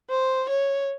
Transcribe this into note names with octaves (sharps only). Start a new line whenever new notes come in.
C5
C#5